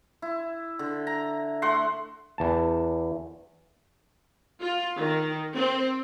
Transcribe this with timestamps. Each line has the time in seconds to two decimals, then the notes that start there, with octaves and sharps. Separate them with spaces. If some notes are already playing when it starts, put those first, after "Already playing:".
0.22 E4
0.79 D3
1.07 A#5
1.62 A3 F#5 C6
2.38 E2 A5
4.60 F4
4.98 D#3
5.55 C4